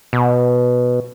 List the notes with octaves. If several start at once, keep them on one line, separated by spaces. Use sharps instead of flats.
B2